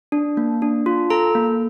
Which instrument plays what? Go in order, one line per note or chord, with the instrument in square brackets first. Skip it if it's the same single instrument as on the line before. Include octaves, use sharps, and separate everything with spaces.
[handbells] D4
A#3
D4
F4
A4 A#5
A#3